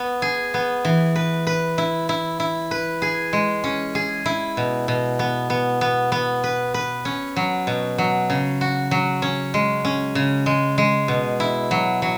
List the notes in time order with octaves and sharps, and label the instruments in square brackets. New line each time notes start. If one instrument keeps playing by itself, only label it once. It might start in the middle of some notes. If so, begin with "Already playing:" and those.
Already playing: [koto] B3
G#4
B3
E3
B4
B4
E4
E4
E4
B4
G#4
G#3
C#4
G#4
E4
B2
B2
B3
B3
B3
B3
B4
B4
C#4
F#3
B2
F#3
C#3
F#4
F#3
C#4
G#3
C#4
C#3
G#3
G#3
B2
E4
F#3
F#3